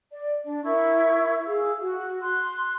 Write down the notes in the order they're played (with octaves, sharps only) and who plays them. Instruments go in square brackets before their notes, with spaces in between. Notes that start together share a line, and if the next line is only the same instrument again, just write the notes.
[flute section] D5
D4
E4 A#4 E5 C#6
G#4 F5 E6
F#4
C6 F#6